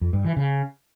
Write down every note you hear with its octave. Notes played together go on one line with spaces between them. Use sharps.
F2
G2
E3
C#3